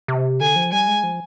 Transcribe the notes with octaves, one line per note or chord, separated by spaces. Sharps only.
C3
D3 G#5
F3
G3 G#5
G#3
F3